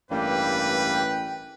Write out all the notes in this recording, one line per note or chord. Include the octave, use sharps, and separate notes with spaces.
A1 G2 G3 A#3 B4 G5